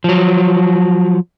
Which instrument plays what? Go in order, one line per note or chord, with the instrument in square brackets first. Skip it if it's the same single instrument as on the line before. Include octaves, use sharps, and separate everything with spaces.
[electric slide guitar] F3 F#3